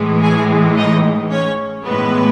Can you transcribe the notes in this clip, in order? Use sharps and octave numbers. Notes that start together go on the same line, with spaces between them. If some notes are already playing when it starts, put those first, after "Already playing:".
Already playing: A2 E3 G#3
G#4 G#5
D#4 D#5
C#4 C#5
A2 E3 G#3 B3 B4